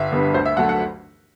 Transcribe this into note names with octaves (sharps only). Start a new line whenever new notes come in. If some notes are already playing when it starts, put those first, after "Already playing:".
Already playing: G1 E5
G2 D3 G3 B3
D2 C5
E5
D3 F#3 A3 F#5
F#5